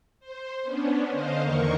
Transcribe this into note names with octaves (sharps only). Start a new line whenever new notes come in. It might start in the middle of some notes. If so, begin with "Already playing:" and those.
C5
B3 C#4 D4
D3 C5 D#5 F5
E2 D3 D#3 A#3 A#4 C#6